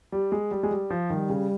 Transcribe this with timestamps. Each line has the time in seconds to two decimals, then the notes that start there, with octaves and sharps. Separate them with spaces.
0.12 G3
0.32 G#3
0.51 G3
0.63 G#3
0.71 G3
0.90 F3
1.10 D#3 G3
1.30 C#3